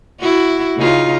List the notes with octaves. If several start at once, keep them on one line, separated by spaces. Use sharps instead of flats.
E4 F#4
C#3 D#4 F4